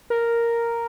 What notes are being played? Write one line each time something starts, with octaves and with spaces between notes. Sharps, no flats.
A#4